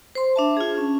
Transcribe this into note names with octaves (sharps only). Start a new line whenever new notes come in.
C5 C6
D4 E5 A5
F4 G#4
C#4